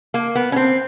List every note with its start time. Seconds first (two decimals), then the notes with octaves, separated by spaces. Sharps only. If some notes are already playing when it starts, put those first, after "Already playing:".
0.14 A#3
0.35 B3
0.52 C#4
0.56 C4